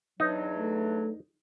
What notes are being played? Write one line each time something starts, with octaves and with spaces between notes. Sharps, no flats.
E2 F#3 D4 D#4
A3